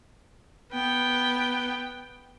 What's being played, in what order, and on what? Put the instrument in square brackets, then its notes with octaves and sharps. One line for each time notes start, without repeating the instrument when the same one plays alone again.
[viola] B3 G5